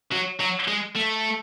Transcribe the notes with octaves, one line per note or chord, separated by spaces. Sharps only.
F#3
F#3
G#3
A3